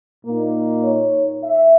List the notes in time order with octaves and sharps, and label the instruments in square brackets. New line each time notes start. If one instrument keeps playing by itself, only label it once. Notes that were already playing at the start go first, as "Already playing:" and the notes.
[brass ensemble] A#2 A#3 D#4
C#5
E5